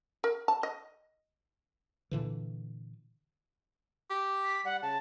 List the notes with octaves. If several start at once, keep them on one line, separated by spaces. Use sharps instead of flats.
A#4
A5
D#5
A#2 D3 E3
G4
B6
G3 F#5
C#3 A5